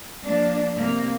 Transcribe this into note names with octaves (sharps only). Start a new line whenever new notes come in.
F3 A#3 D4
C3 A#3